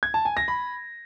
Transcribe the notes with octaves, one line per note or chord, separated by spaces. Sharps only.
G#6
A5
G#5
A#6
B5